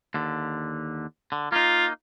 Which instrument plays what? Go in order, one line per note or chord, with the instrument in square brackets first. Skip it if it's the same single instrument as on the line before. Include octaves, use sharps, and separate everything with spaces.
[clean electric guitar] D#2 D3
D3
[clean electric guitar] A#3 D#4 [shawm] F4